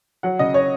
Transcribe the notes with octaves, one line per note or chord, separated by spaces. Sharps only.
F#3 F#5
C#3 D#5
C#5